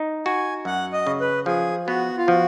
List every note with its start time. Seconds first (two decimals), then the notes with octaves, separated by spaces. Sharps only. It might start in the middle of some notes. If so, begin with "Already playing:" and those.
Already playing: D#4
0.26 F#4 G#5
0.65 F#2 F#5
0.93 D#5
1.07 C#3
1.20 B4
1.46 F3 G#4
1.87 B3 F#4
2.18 F4
2.27 F3 F#4